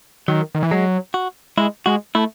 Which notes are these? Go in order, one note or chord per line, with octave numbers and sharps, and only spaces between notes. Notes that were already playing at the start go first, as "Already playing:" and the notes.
D#3 F#3
D#3
E3
F#3 G#3
F#4
G#3 E4
G#3 F#4
A3 E4